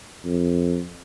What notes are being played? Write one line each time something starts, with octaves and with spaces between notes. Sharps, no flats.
F2